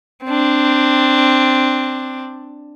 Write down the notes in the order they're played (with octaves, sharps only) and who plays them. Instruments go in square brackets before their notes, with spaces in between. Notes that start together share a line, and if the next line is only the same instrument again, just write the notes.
[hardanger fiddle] C4 D4